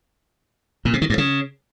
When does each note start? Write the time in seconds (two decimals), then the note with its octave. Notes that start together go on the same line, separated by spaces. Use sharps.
0.85 A#2
0.93 C3
1.02 D#3
1.10 G2
1.18 C#3